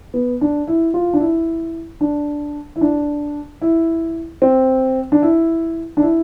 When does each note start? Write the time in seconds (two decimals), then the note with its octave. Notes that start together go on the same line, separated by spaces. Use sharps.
0.14 B3
0.41 D4
0.68 E4
0.94 F4
1.13 D4
1.20 E4
2.01 D4
2.76 E4
2.81 D4
3.62 E4
4.42 C4
5.12 D4
5.22 E4
5.97 D4
6.02 E4